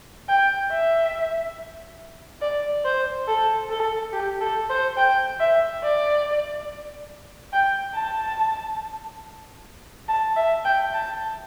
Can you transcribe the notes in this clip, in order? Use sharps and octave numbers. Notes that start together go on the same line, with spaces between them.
G5
E5
D5
C5
A4
A4
G4
A4
C5
G5
E5
D5
G5
A5
A5
E5
G5
A5